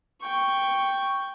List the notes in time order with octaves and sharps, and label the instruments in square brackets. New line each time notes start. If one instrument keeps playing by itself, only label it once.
[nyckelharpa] G5 C#6